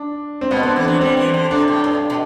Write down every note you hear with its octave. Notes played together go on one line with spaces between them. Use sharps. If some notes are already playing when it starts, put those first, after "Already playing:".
Already playing: D4
C4
B2 B3
D3
C4
E3
F#3 D4
G3 C4
E3
D3
C3 D4
A2
G2
B2